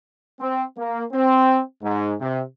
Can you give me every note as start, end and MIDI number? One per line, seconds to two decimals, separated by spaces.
0.40 0.63 60
0.77 1.03 58
1.12 1.59 60
1.82 2.13 44
2.21 2.41 48